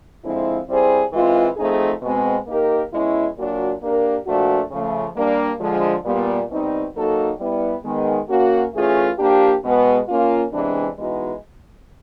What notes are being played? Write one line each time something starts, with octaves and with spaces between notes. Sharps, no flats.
D3 F3 G#3 C4 E4
G3 C4 E4 G#4 C5
E3 G#3 C4 F4
F3 A3 C4 D#4 G#4
B2 G#3 C4
A#3 D#4 G4 A#4
B2 G#3 C#4 E4
A#2 F#3 A#3 D4 F#4
A#3 D4 G4 A#4
A#2 F3 A3 D4 F#4
C#3 F3 A3
G3 A#3 D4
D3 F3 G#3
A#2 G3 B3
B2 G3 C4 D#4
F#3 A#3 D#4 F#4 A4
G3 B3 E4
D#3 G#3 B3
A#3 C#4 F#4
E3 A3 C#4 F4 G#4
F3 A#3 D4 G4
B2 G#3 B3
A#3 C#4 F4
C3 E3 G#3 B3 D4
E3 G#3 B3 D#4 F#4